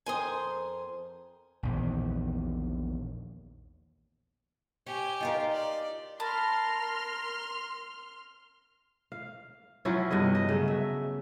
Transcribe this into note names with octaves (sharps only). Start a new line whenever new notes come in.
F2 A#4 C5 G#5 C6 D#6
A#1 E2 D#3
G4 C#5 G#5
D#4 F4 A#4
D5
A#4 A5 B5 C6 F6
F5
F3 F#3 C#4 E4
G2 C3 B3 D#5
D#5
C#3 F#3 A3
E5